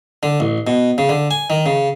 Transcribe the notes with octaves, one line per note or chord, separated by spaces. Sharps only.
D3
A1
B2
C#3
D3
G#5
D#3
C#3